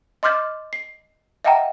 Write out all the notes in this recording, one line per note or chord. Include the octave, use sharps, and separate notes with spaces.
D#5 C6 D6 F6 G6 A6
C7
D#5 E5 F#5 G5 A5 A#5